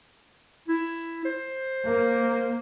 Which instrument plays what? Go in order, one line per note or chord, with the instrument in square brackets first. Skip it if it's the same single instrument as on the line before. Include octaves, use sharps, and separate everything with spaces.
[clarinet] E4
C5
[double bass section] A#3